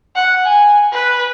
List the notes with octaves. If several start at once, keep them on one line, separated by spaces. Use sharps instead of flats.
F#5
G#5
B4